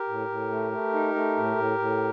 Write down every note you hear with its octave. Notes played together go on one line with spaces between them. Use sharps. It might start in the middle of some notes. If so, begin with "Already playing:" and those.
Already playing: G4 A#4
A2
A2
A3
A3
D#4
A3
A2
A2
A2